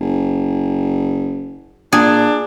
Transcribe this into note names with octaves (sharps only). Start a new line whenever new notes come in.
F#1
A#2 D4 G#4